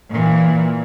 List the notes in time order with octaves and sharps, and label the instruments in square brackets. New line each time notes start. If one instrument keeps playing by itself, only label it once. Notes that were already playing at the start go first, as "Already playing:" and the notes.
[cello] A#2 E3